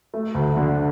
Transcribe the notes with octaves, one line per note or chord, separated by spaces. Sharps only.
A3
D2
D3